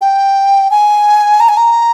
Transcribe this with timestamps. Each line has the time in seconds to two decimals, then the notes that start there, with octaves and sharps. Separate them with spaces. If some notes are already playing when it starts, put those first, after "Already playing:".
0.01 G5
0.71 G#5
1.40 A#5
1.49 G#5
1.57 A#5